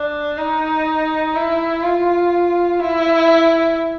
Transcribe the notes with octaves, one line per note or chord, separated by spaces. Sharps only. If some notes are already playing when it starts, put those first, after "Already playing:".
Already playing: D4
D#4
E4
F4
E4